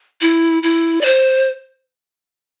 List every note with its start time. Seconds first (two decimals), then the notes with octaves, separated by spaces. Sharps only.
0.21 E4
0.63 E4
1.01 D5
1.05 C5